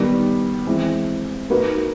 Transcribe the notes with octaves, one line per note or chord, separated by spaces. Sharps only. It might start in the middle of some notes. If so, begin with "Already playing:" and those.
Already playing: D#3 G3 B3
E3 G#3 C4
A#3 D#4 F#4 B4